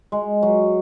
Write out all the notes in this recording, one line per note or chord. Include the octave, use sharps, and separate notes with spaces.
G#3
F#3